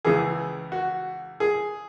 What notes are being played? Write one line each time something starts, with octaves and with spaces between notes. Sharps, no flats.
C#2 C#3 E3 G#4
F#4
G#4